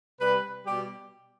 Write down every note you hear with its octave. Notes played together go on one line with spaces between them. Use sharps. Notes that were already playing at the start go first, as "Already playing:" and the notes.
C3 G3 B4
B2 G3 G4